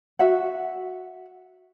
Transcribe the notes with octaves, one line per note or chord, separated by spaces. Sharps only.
F#4 E5 F#5